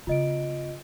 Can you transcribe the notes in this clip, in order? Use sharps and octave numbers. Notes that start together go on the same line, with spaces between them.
C#3 B3 F4 D#5 D7